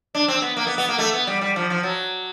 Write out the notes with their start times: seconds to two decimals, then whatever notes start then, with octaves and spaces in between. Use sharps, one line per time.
0.15 D4
0.28 C4
0.42 B3
0.57 A#3
0.67 B3
0.78 B3
0.89 A#3
0.99 A3
1.13 B3
1.27 G3
1.41 G3
1.56 F3
1.70 F3
1.83 F#3